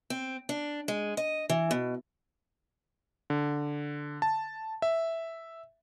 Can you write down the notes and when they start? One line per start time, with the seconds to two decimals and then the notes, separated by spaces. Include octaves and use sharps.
0.10 C4
0.49 D4
0.88 G#3
1.17 D#5
1.50 E3
1.71 B2
3.30 D3
4.22 A5
4.82 E5